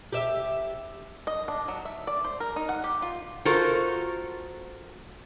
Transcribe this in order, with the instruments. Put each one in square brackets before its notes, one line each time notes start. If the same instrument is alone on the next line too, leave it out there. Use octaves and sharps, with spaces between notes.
[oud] G4 E5
[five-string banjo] D#5
D4
F#3
E5
D5
C5
A#4
D#4
F#5
G4
F4
[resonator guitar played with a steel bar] F4 F#4 A4 A#4 C5